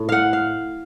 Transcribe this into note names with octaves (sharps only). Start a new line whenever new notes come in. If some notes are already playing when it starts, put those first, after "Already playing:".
Already playing: A2
F5 F#5
F5